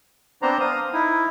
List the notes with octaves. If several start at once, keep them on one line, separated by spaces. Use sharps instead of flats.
B3 C4 D4 C5 A#5
F5 D#6
D#4 E4